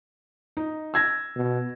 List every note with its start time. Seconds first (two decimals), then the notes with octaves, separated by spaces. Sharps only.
0.57 D#4
0.94 E6 G#6 A#6
1.36 B2